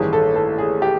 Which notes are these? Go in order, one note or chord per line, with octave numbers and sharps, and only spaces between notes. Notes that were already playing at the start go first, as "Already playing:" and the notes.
Already playing: A1 G2 D#3 G#4
A4
A4
G#4
G4